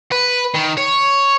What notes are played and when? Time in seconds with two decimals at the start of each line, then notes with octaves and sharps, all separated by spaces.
0.12 B4
0.54 D#3
0.77 C#5